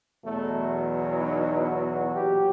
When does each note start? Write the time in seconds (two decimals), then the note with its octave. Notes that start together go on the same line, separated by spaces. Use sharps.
0.24 E2 B2 F#3 A3
1.20 D#4
1.68 F#4
2.15 A#2 F#3 G4